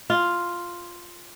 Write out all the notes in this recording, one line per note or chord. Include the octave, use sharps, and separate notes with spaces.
F4